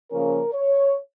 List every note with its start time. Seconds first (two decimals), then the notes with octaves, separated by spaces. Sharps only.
0.11 C#3 F3 A#3 C#4 A#4
0.53 C#5